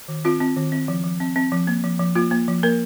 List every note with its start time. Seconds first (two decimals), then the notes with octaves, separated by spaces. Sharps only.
0.08 D#3
0.25 C4 F4
0.40 C4
0.57 D#3
0.72 C4
0.88 F3
1.04 F3
1.20 C4
1.36 C4
1.52 F3
1.67 A#3
1.84 F3
1.99 F3
2.15 A#3 F4
2.31 A#3
2.48 F3
2.63 A#3 A#4